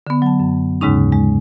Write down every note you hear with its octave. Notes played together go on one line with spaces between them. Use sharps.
D3 B3
F#3 A5
F#2
D#2 G#2 C#3 G#3 C#4 D#4
G#3